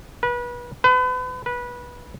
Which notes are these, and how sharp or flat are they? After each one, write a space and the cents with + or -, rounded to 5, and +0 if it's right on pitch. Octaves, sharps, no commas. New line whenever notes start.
B4 -30
B4 +35
B4 -20